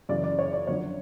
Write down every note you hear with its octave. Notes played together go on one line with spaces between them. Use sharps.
F#2 C#3 E3 D5
D5
C#5
D5
F2 D3 F#3 C#5